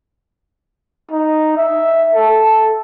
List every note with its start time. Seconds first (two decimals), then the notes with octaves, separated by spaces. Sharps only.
1.11 D#4
1.57 E5
2.14 A4